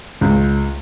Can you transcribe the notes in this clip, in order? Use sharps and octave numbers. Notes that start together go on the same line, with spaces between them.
C#2